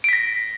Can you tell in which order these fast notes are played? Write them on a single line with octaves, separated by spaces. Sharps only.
D7 B6 A#6